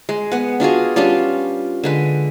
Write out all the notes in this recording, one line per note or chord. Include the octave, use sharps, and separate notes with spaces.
G#3
B3 F#5
D4 F4 F#4 G#4
G3 C#4 D4 F4
D3 G#3 B4